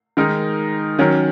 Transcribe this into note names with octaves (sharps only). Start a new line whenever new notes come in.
D#3 G#3 D#4 A#4
D#3 F#3 C#4 A#4